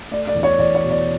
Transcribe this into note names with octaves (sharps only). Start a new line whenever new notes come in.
A3 D5
D5
E2
C#5
E2 D5
C#5
B2
D5